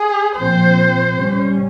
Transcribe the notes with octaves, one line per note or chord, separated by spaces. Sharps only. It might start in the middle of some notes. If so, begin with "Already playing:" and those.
Already playing: G#4
A#2 F3 C4 C5
C3 G3 C#4